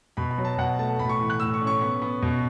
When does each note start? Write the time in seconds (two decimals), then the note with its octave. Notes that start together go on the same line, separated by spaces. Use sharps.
0.17 B2 B5
0.31 B5
0.38 F#3
0.45 A5
0.58 B2 F#5
0.79 A3 A5
0.99 A2 B5
1.09 C#6
1.19 E3
1.30 F#6
1.40 A2 E6
1.54 C#6
1.61 C#4
1.67 C#6
1.81 B3
2.02 B3
2.22 B2